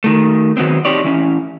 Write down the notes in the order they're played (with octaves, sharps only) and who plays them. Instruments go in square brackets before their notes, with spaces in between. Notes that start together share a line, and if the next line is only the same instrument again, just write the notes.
[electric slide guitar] D#3 A3
D#3 F#3 B3 C4
C4 D#4 G4 C#5 D5
E3 C#4